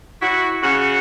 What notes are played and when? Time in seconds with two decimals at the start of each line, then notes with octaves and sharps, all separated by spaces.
0.22 E4 F#4
0.62 C#3 F#4 F#5